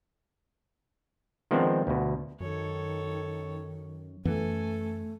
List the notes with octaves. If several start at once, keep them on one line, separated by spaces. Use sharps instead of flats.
D#3 F3 G#3 B3 C4 D4
D2 B2
F#2 D#3 A4 C#5
F#2 E3 A3 B3 A4 G#5